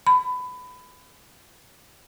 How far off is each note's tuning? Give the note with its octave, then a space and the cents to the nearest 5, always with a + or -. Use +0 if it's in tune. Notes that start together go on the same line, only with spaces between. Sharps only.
B5 +20